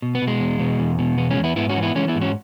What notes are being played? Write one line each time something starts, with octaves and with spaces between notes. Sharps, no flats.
B2
B3
B2
G#3
E2
B2
E2
B2
E2 B3
G#3 C#4
E2
B3 E4
G#2 B3 E4
C#4 F#4
E3
B3 E4
E3 G#3 C#4
B3 E4
G#2
C#4 F#4